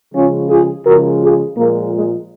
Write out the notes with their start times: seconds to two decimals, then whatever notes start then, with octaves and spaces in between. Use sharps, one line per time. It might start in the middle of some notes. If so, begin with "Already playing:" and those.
0.14 C#3 F3 G#3 C#4 F4
0.49 F4 G#4
0.85 C#3 F3 G#3 F#4 A#4
1.21 F4 G#4
1.57 A#2 F3 G#3 A#3
1.93 G#3